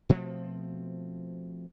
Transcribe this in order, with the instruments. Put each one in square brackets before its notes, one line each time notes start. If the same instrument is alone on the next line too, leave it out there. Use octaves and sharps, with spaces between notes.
[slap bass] B2 F3 A3 C4